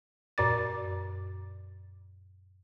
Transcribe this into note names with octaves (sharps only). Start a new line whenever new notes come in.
F#2 A#2 D5 D6 A6